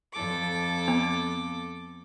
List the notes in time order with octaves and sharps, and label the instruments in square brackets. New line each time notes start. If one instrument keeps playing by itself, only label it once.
[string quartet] F2 A4 D6
[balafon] B3